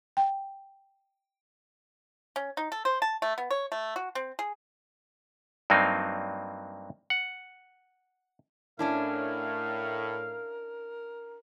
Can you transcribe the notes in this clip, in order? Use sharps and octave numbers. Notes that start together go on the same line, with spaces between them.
G5
C#4
D#4
A4
C5
A5
A3
B3
C#5
A3
F#4
C4
G#4
G2 F#3 A#3 C4 D#4
F#5
A2 C#4 D4 E4 A#4 F5